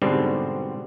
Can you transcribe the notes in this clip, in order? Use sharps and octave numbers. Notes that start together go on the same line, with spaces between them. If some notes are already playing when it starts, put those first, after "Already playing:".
G#2 B2 D3 G3 C4